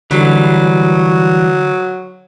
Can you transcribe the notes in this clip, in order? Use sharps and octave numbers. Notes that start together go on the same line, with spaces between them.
D3 E3 F#3 G3